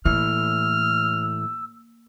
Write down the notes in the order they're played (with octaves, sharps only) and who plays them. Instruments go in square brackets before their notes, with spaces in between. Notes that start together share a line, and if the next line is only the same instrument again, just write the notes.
[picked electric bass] A2 E3 [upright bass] A#3 [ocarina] E6 [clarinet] F6